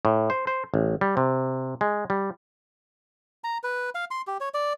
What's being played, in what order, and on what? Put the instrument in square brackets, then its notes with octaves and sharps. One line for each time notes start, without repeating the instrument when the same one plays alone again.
[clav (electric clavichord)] A2
C5
C5
A1
G3
C3
G#3
G3
[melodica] A#5
B4
F5
C6
G4
C#5
D5